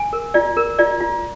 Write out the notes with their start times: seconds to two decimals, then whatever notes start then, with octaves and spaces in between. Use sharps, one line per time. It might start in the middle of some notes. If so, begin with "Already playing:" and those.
Already playing: G#5
0.13 A#4
0.34 F4 D5
0.57 A#4
0.79 F4 D5
1.01 F4